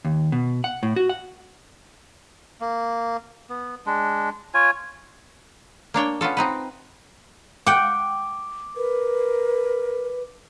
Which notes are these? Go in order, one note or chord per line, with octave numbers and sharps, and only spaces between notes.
D#2
B2
F#5
A2
F#4
F#5
A#3
B3
G#3 D4
F4 C#5 G#5
A#3 D4 C#5 G5
B3 C#4 F4 A4
C4 D#4 B4
F#5 G5 D6
A#4 B4